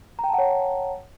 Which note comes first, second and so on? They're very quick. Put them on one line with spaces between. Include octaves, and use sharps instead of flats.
A#5 G5 A5 F#5 C#5